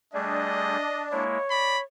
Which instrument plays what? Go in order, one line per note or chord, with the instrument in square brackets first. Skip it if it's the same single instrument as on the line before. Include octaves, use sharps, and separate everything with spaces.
[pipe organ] G3 A3 G#4 [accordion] D4 [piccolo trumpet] D#5
[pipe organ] G#3 A#3 E4 [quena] C#5
[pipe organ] D5 [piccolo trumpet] B5